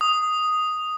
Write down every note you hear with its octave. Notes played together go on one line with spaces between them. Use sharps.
D#6